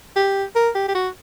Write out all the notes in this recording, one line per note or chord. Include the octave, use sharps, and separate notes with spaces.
G4
A#4
G4
G4
F#4